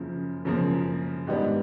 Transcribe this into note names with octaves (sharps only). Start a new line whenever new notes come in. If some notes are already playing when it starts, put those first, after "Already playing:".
Already playing: F#2 C#3 F3 A#3
F#2 C#3 F3 A#3
G#2 D#3 G3 B3 D4